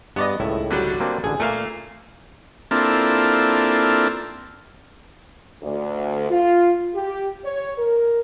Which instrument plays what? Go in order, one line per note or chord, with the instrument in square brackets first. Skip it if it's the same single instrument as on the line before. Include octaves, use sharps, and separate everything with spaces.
[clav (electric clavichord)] G2 [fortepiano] B3 D5 D#5
[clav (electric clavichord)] C#2 A2 D#3 [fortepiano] E4
[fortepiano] D3 F#3 G3
[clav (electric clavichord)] A#3 C4 D4
[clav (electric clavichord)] A1 D2 D3 [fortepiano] G#4
[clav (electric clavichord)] A#2 [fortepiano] A3 A#3 F5
[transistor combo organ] A#3 C4 D4 E4 F4 A4
[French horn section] D2
F4
G4
C#5
A#4